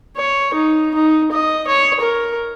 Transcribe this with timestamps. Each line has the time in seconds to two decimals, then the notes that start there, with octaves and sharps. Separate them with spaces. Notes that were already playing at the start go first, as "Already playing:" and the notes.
0.17 C#5
0.55 D#4
0.94 D#4
1.32 D#5
1.68 C#5
2.01 A#4